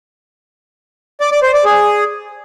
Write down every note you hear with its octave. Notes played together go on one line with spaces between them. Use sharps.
D5
D5
C5
D5
G#4